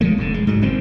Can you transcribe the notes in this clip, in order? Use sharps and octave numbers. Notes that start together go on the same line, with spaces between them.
C#3 F3 G#3 A3
F1 A2 D3
G#3
G#2 F#3
F#1 E2 D#3 C4